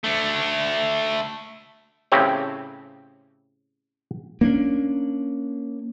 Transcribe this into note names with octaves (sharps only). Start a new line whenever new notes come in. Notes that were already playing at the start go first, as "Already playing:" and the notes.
A3 D4
A2 C#3 C4 G4 C#5 G5
A#3 C#4 D4